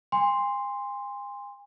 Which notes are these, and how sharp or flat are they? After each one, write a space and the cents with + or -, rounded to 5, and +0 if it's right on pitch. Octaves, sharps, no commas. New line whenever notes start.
G#5 -40 C6 +0